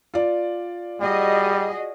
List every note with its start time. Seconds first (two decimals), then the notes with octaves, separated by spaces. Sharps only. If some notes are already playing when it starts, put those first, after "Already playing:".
0.14 F4 D5
1.01 G3 F#4 G#4 D#5